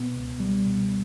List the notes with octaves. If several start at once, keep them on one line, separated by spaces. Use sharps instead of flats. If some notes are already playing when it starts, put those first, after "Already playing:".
Already playing: B2 B3
C#2
G3
B2